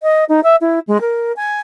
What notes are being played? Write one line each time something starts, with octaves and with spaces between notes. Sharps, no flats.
D#5
D#4
E5
E4
G#3
A#4
G#5